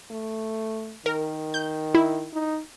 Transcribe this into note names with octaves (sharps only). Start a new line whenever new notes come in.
A3
D#3 A#4
G6
E4
D#4